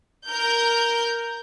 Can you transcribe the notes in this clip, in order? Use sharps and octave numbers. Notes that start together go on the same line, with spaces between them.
A#4 G6